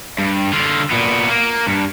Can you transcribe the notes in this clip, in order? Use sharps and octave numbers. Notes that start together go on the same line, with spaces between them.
G2
D3 F4
A#2 B3
A#3
G2